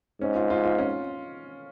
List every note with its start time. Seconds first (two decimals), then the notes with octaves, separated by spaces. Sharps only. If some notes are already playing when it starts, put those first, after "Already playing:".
0.21 G#2 C#4
0.35 F4
0.50 F4
0.65 F4
0.78 C#4